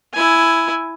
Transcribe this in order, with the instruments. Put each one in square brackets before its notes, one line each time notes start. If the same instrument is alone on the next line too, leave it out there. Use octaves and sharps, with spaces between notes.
[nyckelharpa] E4 G#5